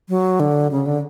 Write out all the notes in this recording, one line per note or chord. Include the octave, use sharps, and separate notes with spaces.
F#3
D3
C#3
D3